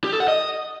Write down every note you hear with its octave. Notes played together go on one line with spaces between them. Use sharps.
G4
A4
F#5
D#5